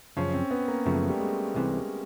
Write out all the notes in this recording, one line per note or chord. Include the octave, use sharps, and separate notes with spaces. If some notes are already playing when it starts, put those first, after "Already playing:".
F#2 C#3 F3 C#4
C4
B3
A#3
F#2 C#3 F3 A3
G3
G#3
C2 C3 E3